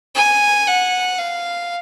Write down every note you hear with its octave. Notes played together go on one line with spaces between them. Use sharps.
G#5
F#5
F5